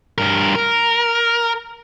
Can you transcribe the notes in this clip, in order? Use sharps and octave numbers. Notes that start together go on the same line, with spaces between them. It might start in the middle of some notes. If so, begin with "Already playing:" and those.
G2 A#4
A#4